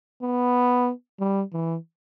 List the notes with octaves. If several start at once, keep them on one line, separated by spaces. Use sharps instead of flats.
B3
G3
E3